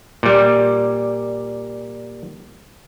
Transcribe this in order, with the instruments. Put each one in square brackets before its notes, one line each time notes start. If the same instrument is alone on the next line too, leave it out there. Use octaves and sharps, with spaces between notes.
[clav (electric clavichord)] A#2 G3